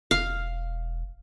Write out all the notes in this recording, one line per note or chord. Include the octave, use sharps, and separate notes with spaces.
E1 F5